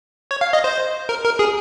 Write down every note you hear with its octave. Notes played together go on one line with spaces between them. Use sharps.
C#5
F5
D#5
C5
A#4
A#4
G#4